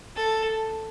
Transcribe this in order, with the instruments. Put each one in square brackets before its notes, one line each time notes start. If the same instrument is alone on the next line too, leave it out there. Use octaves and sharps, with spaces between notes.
[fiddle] A4